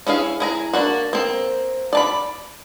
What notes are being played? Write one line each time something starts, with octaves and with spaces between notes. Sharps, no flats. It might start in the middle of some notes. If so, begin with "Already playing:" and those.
C#4 E4 G#4 F5
E4 G#4 A#5
A#3 D4 F#4
A#3 C4
D5 A5 B5